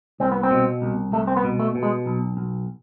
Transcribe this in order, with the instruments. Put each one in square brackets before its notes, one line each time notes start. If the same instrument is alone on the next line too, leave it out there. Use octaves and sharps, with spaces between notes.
[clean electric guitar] C2 C4
B3
C4
B2
C2
C2 A3
C4
B3
B2
A3
B2
G#3
B1
B1